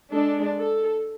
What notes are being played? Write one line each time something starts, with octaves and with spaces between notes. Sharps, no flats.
G#3 D4 A4
A4